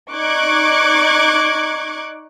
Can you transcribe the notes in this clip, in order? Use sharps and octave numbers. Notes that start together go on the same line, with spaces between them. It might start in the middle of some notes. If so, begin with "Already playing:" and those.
D#4 D5 C#6 D6 F#6 G#6